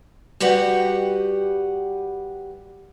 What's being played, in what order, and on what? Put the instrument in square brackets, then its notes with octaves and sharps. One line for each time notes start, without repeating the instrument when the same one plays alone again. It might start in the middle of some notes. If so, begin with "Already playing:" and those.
[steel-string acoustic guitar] G3 F#4 G4 B4 F#5